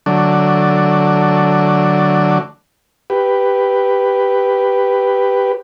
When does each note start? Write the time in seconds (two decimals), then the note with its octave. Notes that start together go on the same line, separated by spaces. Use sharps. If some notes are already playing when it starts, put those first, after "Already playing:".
0.06 D3 F#3 A3 D4
3.10 G4 B4